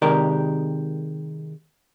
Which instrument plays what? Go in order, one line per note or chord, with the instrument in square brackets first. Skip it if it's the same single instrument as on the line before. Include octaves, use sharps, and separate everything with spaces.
[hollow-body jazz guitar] C3 D#3 G#3 G4 A#4 D5